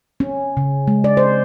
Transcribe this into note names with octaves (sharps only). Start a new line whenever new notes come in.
C#4
C#3
G#3
D5
C5